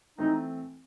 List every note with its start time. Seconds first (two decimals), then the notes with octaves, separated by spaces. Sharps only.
0.18 E3 A3 C4 D#4